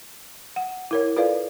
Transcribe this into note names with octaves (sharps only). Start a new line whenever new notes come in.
F#5
E4 A#4 C#5
F4 A4 B4 D5 F5